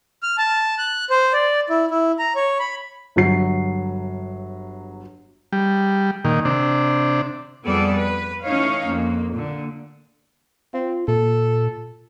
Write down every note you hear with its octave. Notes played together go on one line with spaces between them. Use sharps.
F6
A5
F#6
C5
D5
E4
E4
A#5
C#5
B5
G1 F#3 C7
G3
A#2 D#3
C3 D4
F2 G3 B3 G#4 A4 D5
B4
E3 A3 C#4 D#4 C#5 F5
F2 A#3
A#2 D3
C4 F4
A#2 A4